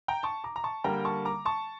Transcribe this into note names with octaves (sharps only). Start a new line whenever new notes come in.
G5 A#5
A5 C#6
A#5 D6
A#5
A5 C#6
D3 G3 A#3 G5 A#5
A5 C#6
A#5 D6
A5 C#6